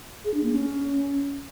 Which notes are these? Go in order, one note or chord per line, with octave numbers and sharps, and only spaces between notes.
G#4
D4
A#3
C#4